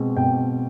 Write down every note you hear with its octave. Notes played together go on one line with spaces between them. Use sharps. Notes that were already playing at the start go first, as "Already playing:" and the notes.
Already playing: B2 G#3 C4
B2 G5